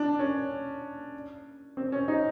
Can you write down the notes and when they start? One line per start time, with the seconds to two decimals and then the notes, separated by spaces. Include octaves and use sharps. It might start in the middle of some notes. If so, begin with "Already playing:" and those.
Already playing: D4
0.19 C#4
1.77 C4
1.92 C#4
2.08 D#4